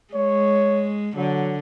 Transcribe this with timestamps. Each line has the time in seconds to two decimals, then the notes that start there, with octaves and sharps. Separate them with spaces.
0.14 G#3 C#5
1.16 D3 F#3